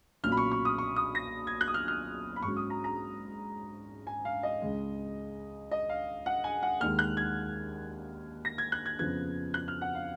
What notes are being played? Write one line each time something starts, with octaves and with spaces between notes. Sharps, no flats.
B1 A#2 F#3 C#4 F6
B5
C#6
C#6
D#6
C#6
D#6
A#6
G#6
F#6
D#6
F6
F6
B5
G#2 F#3 C#4 C#6
D#6
A#5
A#5
G#5
F5
D#5
C#2 C#3 G#3
D#5
F5
F#5
G#5
F#5
D#2 D#3 G#3 F6
F#6
G#6
A#6
G#6
F#6
G#6
F2 C#3 F3 B3 G#6
F#6
F6
F#5
F5